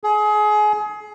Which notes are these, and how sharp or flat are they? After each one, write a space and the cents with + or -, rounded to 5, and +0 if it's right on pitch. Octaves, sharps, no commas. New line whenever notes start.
G#4 +25